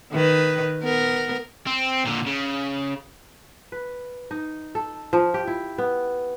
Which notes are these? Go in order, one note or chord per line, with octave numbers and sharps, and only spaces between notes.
D#3 B4
B3 A#4
C4
A#2 D3
C#3
B4
D#4
A4
F3
G4
E4
B3